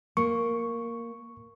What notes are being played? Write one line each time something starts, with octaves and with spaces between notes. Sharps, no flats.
A#3 C#6